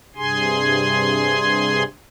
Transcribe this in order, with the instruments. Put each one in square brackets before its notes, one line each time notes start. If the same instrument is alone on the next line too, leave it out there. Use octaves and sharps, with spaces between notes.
[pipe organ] G2 C3 G#4 G#5 C6